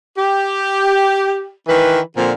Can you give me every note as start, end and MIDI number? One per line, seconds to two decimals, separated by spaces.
0.17 1.53 67
1.68 1.99 51
1.68 1.99 52
1.68 1.99 71
2.16 2.32 46
2.16 2.32 50
2.16 2.32 53
2.16 2.32 60